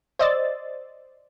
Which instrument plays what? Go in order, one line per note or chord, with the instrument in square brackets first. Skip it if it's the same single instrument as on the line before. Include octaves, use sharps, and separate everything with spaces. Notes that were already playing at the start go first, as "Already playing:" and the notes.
[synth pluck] C5 D5 D#5 E6 A6